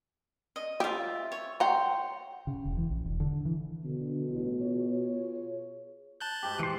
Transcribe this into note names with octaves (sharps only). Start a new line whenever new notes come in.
D#5
F4 G4 E5
C#5
C#5 F#5 G5 A#5 C6
C#3
E1
E3
A#1
E1
D3
E3
B2 D3
A1
F4 G#4 C#5
A5 F#6 G6
G#2 G4
E3 C6